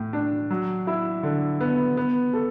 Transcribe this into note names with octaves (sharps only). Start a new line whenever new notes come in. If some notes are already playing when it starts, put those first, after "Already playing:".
Already playing: A2
D4
F#3
E4
D3
B3
B3
A4